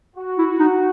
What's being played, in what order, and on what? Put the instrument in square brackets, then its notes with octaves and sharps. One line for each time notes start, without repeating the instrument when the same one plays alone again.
[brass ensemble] F#4
[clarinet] E4
D#4